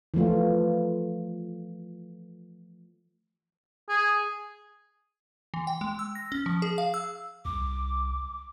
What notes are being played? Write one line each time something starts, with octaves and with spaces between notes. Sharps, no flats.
E3 F3 A3 F4
G#4
E3
G5
G#3
E6
A#6
C#4
F3
G#4
F5
E6
C2 D6